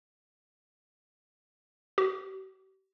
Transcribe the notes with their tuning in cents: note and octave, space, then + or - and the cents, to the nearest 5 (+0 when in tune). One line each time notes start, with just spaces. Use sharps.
G4 -45